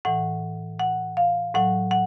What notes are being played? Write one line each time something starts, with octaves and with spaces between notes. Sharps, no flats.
A2 E3 F#5
F#5
F5
A2 F#3 F#5
F#5